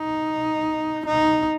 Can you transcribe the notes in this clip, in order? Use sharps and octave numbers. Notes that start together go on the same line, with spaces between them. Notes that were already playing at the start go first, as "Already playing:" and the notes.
Already playing: D#4
D#4